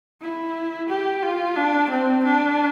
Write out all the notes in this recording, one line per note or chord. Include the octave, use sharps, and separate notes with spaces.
E4
G4
F4
D4
C4
D4